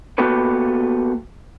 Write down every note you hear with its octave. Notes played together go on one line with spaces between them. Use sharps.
A#3 B3 F#4 G4 A4 B4